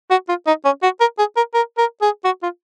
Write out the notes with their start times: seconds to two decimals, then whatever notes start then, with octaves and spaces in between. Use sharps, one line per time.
0.11 F#4
0.29 F4
0.47 D#4
0.65 C#4
0.83 F#4
1.00 A#4
1.19 G#4
1.37 A#4
1.54 A#4
1.78 A#4
2.02 G#4
2.25 F#4
2.43 F4